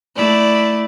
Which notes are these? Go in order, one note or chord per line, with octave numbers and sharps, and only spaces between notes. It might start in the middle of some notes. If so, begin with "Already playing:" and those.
A3 E4 D5